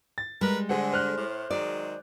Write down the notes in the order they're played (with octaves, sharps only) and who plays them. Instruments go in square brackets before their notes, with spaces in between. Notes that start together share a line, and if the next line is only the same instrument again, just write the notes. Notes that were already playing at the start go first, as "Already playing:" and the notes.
[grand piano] A6
[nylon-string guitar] G3 G#3 [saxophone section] A#4 B4
[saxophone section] D3 [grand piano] G#4 C5 F#5
[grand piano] C5 F6 F#6
[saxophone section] A2
[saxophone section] D#3 F#3 G#3 [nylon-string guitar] D5